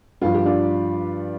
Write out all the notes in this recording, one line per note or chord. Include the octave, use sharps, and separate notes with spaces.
G2 F3 F4
G4
D4 F4